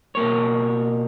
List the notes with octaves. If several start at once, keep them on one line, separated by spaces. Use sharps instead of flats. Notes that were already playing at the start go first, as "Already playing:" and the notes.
B2 A#3 C#5